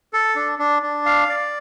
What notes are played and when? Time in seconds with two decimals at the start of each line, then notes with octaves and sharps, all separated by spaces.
0.13 A4
0.36 D4
0.59 D4
0.82 D4
1.06 F5
1.29 D5